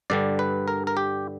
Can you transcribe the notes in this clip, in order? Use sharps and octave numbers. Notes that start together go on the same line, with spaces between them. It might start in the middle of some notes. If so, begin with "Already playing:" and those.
G2 D3 G3 D5
B4
A#4
A#4
G4